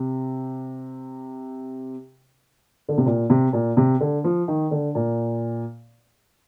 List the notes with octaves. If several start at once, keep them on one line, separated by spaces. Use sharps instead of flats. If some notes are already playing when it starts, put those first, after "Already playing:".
Already playing: C3
D3
C3
A#2
C3
A#2
C3
D3
F3
D#3
D3
A#2